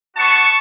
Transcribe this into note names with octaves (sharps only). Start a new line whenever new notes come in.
B3 D4 F#4 A5 C#6